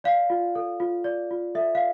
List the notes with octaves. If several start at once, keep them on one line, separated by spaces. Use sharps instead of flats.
D5 F5
F4
A4
F4
D5
F4
A4 E5
F5